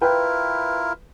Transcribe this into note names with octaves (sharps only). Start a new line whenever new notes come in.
E4 F4 A#4 B4 G5